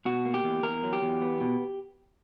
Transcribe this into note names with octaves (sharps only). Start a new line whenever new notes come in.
B2 F#4
A#3
G4
E2
E2 A#4
F#3
G4
E2
B3
B2